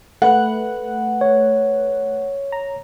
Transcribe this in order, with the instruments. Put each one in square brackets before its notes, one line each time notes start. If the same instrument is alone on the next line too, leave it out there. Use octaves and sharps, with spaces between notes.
[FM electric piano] A3 B4 F#6 [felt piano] F#5
[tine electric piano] C#5
[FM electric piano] A#5